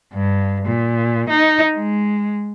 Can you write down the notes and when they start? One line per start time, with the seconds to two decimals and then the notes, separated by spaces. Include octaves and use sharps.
0.14 G2
0.66 A#2
1.30 D#4
1.76 G#3